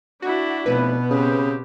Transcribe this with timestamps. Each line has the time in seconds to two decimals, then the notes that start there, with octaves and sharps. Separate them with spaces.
0.22 D4 E4 F#4
0.66 F1 B2 B3 B4
1.11 C#3 C4 G4